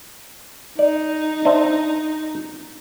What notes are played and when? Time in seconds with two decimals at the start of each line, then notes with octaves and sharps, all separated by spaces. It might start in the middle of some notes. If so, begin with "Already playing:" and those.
0.79 D#4 D5
1.45 D4 C5 E5